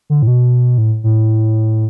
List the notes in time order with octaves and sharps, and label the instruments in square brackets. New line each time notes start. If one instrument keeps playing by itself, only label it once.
[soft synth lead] D3
A2
B2
A2
A2